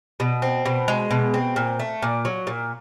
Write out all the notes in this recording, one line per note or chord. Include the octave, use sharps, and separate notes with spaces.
B2
C4
B2
G#3
B2
C4
A#2
A3
A#2
F#3
A#2